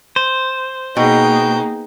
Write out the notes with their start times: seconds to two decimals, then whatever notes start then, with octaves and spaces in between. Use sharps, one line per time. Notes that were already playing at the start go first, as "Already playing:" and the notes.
0.16 C5
0.97 B2 A#3 D#4 G#4 G5